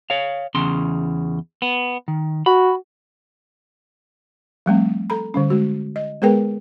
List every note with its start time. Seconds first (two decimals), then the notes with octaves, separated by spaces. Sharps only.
0.10 C#5 F5
0.55 E2 C#3 C6
1.62 B3
2.08 D#3
2.46 F#4 B5
4.66 F3 G3 A3 C4
5.10 A4 A#5 B5
5.34 D3 G3 C#4
5.50 G#3 F#4
5.96 D#5
6.22 G#3 B3 G#4 A#4 B4 G5